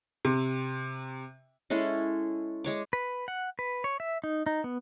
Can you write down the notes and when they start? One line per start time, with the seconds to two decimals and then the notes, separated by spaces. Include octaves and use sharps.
0.25 C3
1.70 G#3 C#4 E4 A4
2.64 G#3 C#5 D6
2.93 B4
3.28 F#5
3.59 B4
3.84 C#5
4.00 E5
4.24 D#4
4.46 D#4
4.64 B3